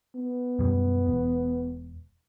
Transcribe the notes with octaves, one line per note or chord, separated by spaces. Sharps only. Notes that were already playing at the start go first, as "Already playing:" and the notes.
B3
F#2 B2 G3
E1